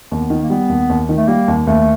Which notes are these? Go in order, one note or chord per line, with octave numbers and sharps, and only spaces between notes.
D#2 B3
D#3
A#3
G3 B3
D#2
D#2
D#3
A3
G3 A#3
D#2
D#2 A3